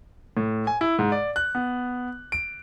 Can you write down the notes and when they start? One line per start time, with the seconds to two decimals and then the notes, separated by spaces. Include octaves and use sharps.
0.37 A2
0.67 G#5
0.81 E4
0.99 G#2
1.12 D5
1.36 F#6
1.55 B3
2.32 D7